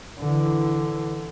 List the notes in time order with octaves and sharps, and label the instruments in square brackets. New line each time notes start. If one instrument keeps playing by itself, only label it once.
[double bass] D3 E3